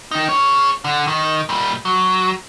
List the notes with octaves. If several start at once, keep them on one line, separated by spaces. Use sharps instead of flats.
D#3 D#4
G#4 C#5
D3
D#3
A#2 G3
F#3